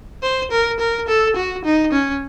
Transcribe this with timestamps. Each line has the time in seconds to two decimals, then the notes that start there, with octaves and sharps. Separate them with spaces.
0.23 C5
0.51 A#4
0.80 A#4
1.08 A4
1.36 F#4
1.65 D#4
1.93 C#4